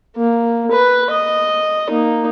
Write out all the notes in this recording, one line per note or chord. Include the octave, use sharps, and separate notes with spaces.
A#3
B4
D#5
A#3 D#4